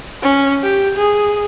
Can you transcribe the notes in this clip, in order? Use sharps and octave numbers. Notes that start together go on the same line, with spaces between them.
C#4
G4
G#4